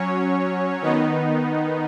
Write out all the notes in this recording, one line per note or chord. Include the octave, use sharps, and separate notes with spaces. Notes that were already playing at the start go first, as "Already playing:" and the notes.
Already playing: F#3 C#4 C#5
D#3 B3 D#4